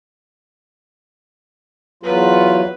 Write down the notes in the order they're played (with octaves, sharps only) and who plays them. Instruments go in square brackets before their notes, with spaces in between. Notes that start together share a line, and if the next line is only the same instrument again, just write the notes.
[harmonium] E2 F#3 F4 [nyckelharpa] B4